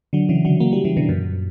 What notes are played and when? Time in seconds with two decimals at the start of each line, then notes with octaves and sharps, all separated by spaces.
0.13 D3 F#3
0.29 C#3 E3
0.45 D3 F#3
0.60 F#3 A#3
0.72 E3 G3
0.85 C#3 E3
0.97 B2 D3
1.09 F#2 A#2